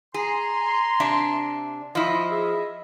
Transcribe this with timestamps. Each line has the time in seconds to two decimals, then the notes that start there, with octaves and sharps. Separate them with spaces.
0.14 G#4 G#5 A#5 C6
1.00 C3 D4 E5
1.95 F3 E4 D#5
2.30 G#4 D#5 E5